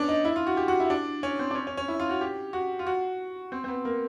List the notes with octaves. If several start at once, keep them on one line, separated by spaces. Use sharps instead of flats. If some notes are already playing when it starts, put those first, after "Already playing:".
Already playing: B3 C#4 D4
D#4
E4
F4
F#4
G4
F#4
E4
D4
C#4
C4
D4
C#4
C#4
C#4
E4
F4
F#4
G4
F#4
F4
F#4
C4
C4
B3
A#3